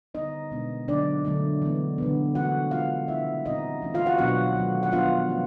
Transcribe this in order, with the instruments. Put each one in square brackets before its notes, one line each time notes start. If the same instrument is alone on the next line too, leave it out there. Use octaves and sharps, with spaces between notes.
[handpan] D3 G3 B3 D#4 D#5
B2 G#3 B3 D4
D3 F#3 A#3 D4 D5
D3 F#3 A3 D4
E3 G#3 B3
D3 G3 B3
E3 A3 C#4 F#4 F#5
E3 G#3 C#4 F4 F5
C3 D#3 G3 E4 E5
A#2 G3 C4 D#4 D#5
E3 A3 C#4
F4 F5
F#4 F#5
B2 F#3 B3 D4 F#4 F#5
D#3 F#3 A3
F#5
D#3 G3 B3 D4 F4 F5
F3 A3 C#4